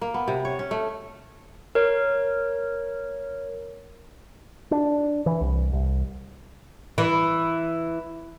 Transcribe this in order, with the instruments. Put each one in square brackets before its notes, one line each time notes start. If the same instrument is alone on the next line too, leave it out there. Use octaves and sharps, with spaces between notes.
[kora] A#3
B3
C3
C#5
C#4
A3
[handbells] A#4 C#5
[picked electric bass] D4
E3
C2
C2
[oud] E3